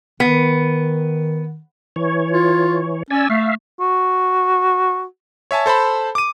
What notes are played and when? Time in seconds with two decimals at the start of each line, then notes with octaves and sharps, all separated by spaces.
0.20 D#3 B3
1.96 E3 C#5
2.31 F4
3.11 C#4 D5 G#5 E6
3.30 A3 E5 F5
3.80 F#4
5.51 C#5 E5 G#5 A5
5.66 A4 C5 A5 B5
6.15 D6 D#7